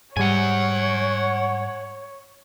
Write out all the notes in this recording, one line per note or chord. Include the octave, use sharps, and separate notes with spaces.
G#2 G3 C#5 F#5 G#5